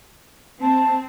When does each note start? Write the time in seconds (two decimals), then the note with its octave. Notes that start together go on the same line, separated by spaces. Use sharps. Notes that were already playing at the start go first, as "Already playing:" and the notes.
0.61 C4 A5